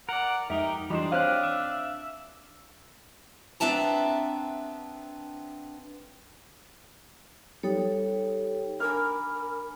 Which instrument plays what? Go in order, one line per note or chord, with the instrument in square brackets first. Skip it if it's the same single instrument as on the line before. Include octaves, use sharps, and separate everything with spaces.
[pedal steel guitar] A#4 D5 [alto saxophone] F#5
[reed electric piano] F2 [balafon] G#3 [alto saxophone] D#4 [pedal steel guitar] G4 A#4
[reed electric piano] E3 [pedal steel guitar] G3 G#3 C5 [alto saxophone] D4 [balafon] F4 F#4 D#5
[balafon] C4 C5 C#5 [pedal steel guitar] G4 D#5 [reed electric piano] F5 F6 F#6
[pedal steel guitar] E5
[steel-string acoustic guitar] B3 C4 D4 E5 A5 A#5
[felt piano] G3 [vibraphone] D#4 A4 C#5
[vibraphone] D4 G#5 B5 [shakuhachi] A#4 [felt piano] F6